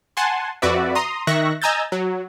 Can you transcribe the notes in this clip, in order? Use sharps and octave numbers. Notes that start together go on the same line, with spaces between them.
F#5 G#5 A5 C6
F2 F#4 B4 D5 E5
A#5 C6 D#6
D#3 E5 C#6 F#6 A#6
D#5 G#5 A#5 E6 G6 A6
F#3